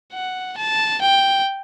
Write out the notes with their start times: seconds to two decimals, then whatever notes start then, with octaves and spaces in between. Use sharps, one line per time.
0.13 F#5
0.58 A5
1.02 G5